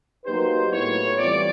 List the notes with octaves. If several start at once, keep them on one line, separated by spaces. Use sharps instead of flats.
F#3 A#3 D#4 G4 B4 C5
A2 F#3 B3 E4 C#5
E3 G3 C4 F4 D5